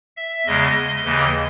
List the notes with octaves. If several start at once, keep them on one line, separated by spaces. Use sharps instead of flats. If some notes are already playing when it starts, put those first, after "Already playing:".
E5
E2 C#3 G#3 D#5
D#2 C#3 E3